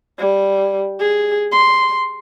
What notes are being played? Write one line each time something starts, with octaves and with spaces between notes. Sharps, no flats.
G3
G#4
C6